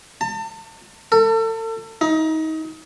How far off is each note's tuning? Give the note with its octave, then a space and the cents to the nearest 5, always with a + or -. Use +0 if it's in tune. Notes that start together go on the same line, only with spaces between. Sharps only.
A5 +35
A4 +35
D#4 +25